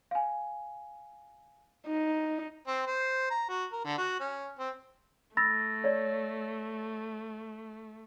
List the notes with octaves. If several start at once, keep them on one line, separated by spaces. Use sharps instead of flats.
F5 G#5
D#4
C4
C5
A#5
F#4
A#4
D3
F#4
C#4
C4
A3 B5 E6 A6 A#6
C#5 D5